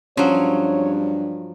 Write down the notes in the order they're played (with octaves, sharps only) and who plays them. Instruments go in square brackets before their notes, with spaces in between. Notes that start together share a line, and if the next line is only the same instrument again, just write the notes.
[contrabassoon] G2 [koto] F3 F#3 [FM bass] C#4 [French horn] C#5